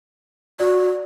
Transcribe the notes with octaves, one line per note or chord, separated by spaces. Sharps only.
F#4 D5